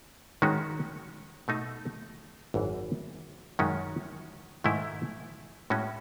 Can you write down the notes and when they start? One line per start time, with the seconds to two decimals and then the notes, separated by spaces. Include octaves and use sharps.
0.42 D#3 G#3 C#4 F#4
1.48 B2 A3 D#4 A4
2.54 G#1 F#2 E3
3.59 F#2 D#3 G#3 C#4 F#4
4.64 G#2 D#3 A3 E4
5.70 A2 G#3 C#4 F#4